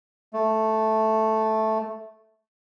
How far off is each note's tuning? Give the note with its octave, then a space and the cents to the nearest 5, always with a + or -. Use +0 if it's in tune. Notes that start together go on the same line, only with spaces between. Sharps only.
A3 -5